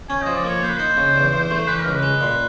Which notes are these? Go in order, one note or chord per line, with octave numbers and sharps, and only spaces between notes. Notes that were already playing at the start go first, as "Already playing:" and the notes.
C#4 G#5
F3 D#5
D5
A#3 C#5
A#3 C5
B4
D#4 C5
C#3
E2
E2
A3
E3 B4
C#2 A#4
B4
G#3
A#2